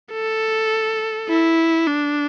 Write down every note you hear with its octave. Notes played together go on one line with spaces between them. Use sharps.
A4
E4
D4